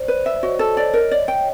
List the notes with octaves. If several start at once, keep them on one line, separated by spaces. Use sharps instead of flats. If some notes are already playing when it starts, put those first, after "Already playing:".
Already playing: C5 D5
B4
E5
F#4 C#5 D#5
A4
D5
A#4 C#5 D#5
D5
G5